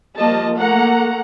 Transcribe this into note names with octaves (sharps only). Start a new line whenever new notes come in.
F3 G3 A#3 D#5 A5
A3 A#3 F#5 A#5